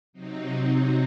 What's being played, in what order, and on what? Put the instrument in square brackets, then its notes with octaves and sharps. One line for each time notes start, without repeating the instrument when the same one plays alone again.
[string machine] C3 F#3 C4 D#4